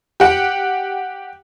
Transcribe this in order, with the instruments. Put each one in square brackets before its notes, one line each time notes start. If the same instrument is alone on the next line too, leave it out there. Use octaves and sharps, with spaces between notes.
[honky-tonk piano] G4 F#5